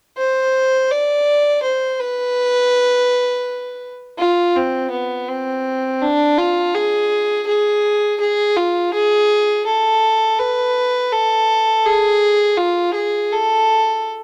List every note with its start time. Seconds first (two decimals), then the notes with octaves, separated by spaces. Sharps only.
0.17 C5
0.90 D5
1.62 C5
2.00 B4
4.18 F4
4.55 C4
4.91 B3
5.28 C4
6.01 D4
6.38 F4
6.74 G#4
7.47 G#4
8.20 G#4
8.56 F4
8.93 G#4
9.66 A4
10.39 B4
11.12 A4
11.85 G#4
12.58 F4
12.94 G#4
13.32 A4